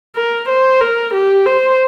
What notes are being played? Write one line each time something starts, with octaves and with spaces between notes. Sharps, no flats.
A#4
C5
A#4
G4
C5